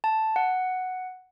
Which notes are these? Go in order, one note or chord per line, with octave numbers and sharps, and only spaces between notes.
A5
F#5